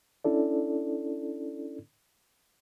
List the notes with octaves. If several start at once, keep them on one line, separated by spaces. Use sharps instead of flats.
C#4 D4 E4 A4 D5